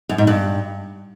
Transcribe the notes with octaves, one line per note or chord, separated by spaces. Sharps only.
F#2
G#2
G2